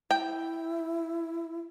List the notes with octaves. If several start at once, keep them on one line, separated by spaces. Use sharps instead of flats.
E4 G5